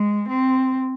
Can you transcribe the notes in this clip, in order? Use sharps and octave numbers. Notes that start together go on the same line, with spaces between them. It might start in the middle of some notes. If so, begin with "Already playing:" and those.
Already playing: G#3
C4